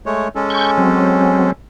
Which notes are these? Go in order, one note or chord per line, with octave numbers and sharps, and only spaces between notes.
G#3 A3 C#5
G#3 C#4 A4
C#6 G6
F#3 C4